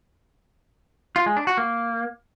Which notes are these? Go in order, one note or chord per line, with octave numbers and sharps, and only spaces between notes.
F4
G#3
D4
F#4
A#3